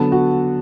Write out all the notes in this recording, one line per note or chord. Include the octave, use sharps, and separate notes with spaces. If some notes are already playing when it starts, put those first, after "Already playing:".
Already playing: D3 F#3 B3 A5
F#4